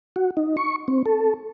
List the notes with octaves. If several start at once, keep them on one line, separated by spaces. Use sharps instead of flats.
F#4
D#4
C#6
C4
A4